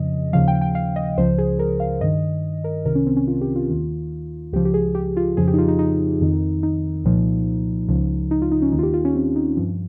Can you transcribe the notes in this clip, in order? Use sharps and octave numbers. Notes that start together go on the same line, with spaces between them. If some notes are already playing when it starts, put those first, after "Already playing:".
Already playing: F2 C#3 F3 D#5
D#2 C#3 F3 F5
G5
G5
F5
D#5
C#2 C#3 F3 C5
G#4
A#4
F5
G2 D#3 D#5
A#4
C2 C3 D#3 A#4
C#4
C4
C#4
F4
G4
F4
D#2 D#3
C#2 C#3 F3 G4
G4
G#4
G4
F4
F2 C#3 F3 G#4
G4
D#4
F4
D#4
D#4
F2 D#3
D#4
C2 A#2 F3
C#2 C#3 F3
D#4
F4
D#4
C#4
D#2 D#3 D#4
F4
G4
F4
C#4
C4
D#4
G2 F3